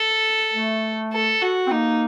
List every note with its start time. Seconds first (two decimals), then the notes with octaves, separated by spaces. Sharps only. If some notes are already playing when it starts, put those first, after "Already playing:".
Already playing: A4
0.53 A3
1.13 A4
1.42 F#4
1.67 C4
1.71 A#3 D#4